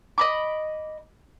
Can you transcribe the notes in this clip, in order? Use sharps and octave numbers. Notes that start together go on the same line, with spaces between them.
D#5 B5 D6